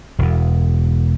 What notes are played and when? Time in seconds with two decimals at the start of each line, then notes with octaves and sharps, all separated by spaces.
0.19 E1 E2